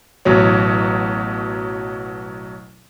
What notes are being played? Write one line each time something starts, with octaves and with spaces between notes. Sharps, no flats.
A1 B2 F#3 C#5